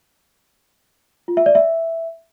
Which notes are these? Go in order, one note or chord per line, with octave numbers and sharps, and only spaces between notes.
F4
E5
D5
E5